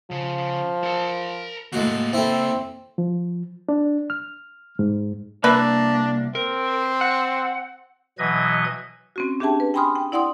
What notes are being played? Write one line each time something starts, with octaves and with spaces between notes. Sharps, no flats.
C#3 F3
A#4 A5
A2 C#3 G#3 A#3 F#4
C4 E4 A4
F3
D4
F6
G#2
C2 A#3 D4 B4 E5
C4 A#4
F#5
B2 E3 F#3 B4 D#5 G#6
C4 C#4 F#4
D4 G4 G#4 E5 G5 A5
B4
G5 G#5 B5 C6 D#6 F6
G5
E4 D5 F#5 G5 C6 D#6